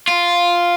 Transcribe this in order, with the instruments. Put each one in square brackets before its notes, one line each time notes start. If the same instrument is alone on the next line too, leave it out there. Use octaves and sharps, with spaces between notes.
[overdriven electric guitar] F4